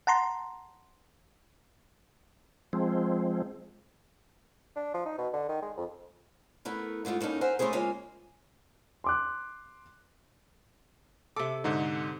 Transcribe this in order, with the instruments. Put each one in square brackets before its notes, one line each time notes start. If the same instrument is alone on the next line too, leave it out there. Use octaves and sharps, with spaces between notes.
[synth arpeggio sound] F#5 A5 A#5 C6
[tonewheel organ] F3 G#3 C4
[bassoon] D4
F3
D#4
B2
D3
D#3
G#3
F2
[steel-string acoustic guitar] A3 B3 E4 A#4
G#2 G#3 A3 F4 G4
A2 A#3 C#4 D#4 A5
A#4 C5 E5 F#5 G#5
C3 A3 C#4 E4 G#4 C5
C#3 G#3 A#3 F4 C#5 G#5
[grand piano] C6 D6 F#6
[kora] C3 A4 [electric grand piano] D6
[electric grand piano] G#2 D3 D#4